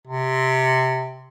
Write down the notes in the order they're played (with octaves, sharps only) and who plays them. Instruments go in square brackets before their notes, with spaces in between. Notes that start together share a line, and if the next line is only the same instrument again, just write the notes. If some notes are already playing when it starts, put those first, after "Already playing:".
[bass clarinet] C3